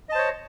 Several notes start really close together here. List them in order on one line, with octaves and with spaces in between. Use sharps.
D#5 A5 C5 C#5